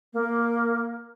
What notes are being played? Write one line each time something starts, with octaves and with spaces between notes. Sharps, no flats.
A#3